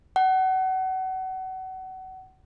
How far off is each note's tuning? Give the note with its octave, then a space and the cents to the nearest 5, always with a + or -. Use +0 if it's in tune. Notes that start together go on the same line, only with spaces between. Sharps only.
F#5 +30